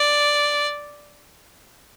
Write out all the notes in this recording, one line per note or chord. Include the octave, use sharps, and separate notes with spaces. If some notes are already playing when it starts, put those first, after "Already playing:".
Already playing: D5